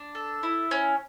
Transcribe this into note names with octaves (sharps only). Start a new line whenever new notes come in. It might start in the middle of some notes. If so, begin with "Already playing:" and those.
Already playing: D4
A4
E4
C#4